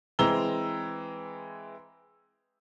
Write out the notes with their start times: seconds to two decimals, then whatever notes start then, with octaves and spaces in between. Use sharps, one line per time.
0.19 E3 G#3 C4 A#5 E6 G7